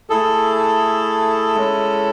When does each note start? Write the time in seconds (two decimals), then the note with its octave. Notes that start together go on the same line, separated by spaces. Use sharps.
0.10 A3 E4 G#4 A4
1.55 G#3 C#4 E4